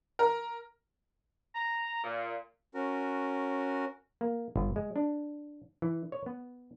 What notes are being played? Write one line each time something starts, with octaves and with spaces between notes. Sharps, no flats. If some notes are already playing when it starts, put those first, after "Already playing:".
A#4
A#5
A#2
C#4 F#4 A#4
A#3
G1
G#3
D4
E3
C#5
B3